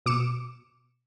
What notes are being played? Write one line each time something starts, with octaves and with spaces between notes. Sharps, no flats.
B2 D6 C#7 E7